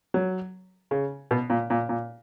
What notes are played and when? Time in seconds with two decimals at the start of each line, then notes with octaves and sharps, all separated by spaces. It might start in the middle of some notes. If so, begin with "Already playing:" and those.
0.14 F#3
0.91 C#3
1.31 B2
1.50 A#2
1.70 A#2
1.89 A#2